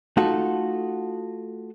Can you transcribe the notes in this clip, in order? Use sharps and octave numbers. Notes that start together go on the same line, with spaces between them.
A3 D#4 F4 F#4 A4